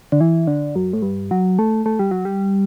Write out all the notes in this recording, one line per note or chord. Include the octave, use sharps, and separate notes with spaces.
D3
E3
D3
F#2
A2
G2
F#3
A3
A3
G3
F#3
G3